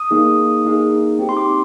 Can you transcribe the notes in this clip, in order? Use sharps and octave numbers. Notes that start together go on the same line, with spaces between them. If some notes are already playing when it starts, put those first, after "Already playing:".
Already playing: D#6
A#3 D#4 G#4
A#3 D#4 G#4
C4 D#4 G4
C6
D6